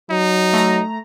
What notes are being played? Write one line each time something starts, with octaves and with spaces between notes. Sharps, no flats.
F#3 D#4
A3 A#5